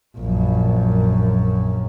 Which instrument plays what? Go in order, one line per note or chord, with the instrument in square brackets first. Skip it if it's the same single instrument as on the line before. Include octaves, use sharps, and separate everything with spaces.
[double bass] A#1 F#2